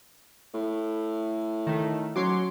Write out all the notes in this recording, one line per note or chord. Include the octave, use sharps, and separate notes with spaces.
A2
D#3 A3
F#3 C#4 F#4 C#5 C6 D6